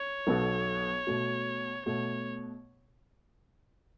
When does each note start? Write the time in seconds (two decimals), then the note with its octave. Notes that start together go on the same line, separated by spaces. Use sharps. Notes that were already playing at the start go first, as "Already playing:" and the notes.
Already playing: C#5
0.27 B1 B2 B3 F#4 A4
1.07 B2 A3 F#4
1.86 B2 A3 F#4 C#5